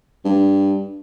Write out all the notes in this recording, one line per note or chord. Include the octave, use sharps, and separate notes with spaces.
G2